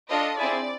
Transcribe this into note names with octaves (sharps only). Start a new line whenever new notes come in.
D4 F4 A4 D#5
C4 E4 G#4 D5